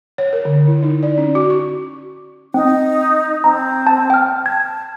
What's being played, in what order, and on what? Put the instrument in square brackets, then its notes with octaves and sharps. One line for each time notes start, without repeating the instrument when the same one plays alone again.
[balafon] C#5
A#4
D3
E4
D#4
D5
C#4
F#4
C#6
[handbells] C4 [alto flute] D#4
[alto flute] C4 [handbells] A#5
[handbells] A5
G5 F6
[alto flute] A5 [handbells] G#6